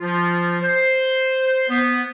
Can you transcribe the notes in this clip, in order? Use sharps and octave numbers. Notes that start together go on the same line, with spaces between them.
F3 F4
C5
B3